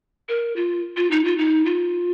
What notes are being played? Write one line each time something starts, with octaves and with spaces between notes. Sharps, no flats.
A#4
F4
F4
D#4
F4
D#4
F4